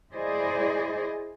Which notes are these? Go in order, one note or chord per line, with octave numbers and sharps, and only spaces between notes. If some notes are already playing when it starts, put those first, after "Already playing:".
E4 G#4 C5 D5 D#5